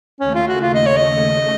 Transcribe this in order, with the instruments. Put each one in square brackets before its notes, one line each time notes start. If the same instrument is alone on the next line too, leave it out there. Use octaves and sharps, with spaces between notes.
[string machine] D#2 C#3 A3 [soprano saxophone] C#4
[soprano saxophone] F4
F#4
F4
D#5
C#5
D#5